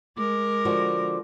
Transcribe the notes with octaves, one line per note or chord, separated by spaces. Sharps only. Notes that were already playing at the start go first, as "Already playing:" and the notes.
G#3 A#4 D6
D3 F3 F#4